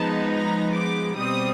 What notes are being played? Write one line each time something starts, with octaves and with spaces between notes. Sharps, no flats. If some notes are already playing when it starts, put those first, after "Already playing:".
Already playing: F3 G#3 B3 D#4 A5
A#5
D6
B2 G3 C4 D#6